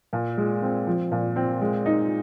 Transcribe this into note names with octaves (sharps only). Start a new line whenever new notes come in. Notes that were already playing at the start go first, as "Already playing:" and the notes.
A#2
G#3
C4
F3
A#2
C4
G#3
D#4